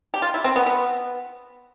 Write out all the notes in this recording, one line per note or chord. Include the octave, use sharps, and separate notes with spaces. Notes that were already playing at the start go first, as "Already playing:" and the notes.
G4
F4
E4
C4
B3
B3